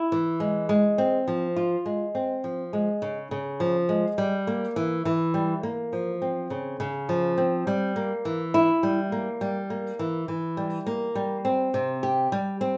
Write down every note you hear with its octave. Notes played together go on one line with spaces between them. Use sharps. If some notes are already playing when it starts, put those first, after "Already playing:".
Already playing: E4
E3
G#3
G#3
C4
F3
F4
G#3
C4
F3
G#3
C#3
C#3
F3
G#3
G3
A#3
E3
E3
G3
A#3
F3
C4
C#3
C#3
F3
C4
G3
A#3
E3
E4
G3
A#3
G3
A#3
E3
E3
G3
A#3
G3
C4
C3
G4
G3
C4